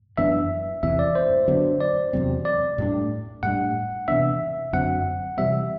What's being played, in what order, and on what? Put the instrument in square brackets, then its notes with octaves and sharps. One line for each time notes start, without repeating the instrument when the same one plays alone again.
[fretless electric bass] F#2 E3 B3 D4 [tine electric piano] E5
[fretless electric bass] E2 C3 E3 [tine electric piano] E5
[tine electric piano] D5
C5
[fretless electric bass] D3 F#3 B3 D4
[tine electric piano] D5
[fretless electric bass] E2 C3 F#3 C4
[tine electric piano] D5
[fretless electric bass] A2 G3 D4
[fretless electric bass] A2 G3 D4 [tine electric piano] F#5
[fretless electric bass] C3 E3 B3 D4 [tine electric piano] E5
[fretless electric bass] F#2 D3 F#3 C4 [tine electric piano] F#5
[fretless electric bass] C3 E3 G3 C4 [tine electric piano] E5